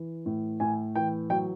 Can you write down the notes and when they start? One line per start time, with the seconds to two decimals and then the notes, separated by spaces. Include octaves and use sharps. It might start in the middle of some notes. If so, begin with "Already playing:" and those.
Already playing: E3
0.26 A2
0.60 A2 G#5
0.95 E3 G5
1.30 F#3 G5